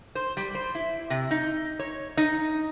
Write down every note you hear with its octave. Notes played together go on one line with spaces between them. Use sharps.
C5
G3
C5
E4
C3
D#4
C#5
D#4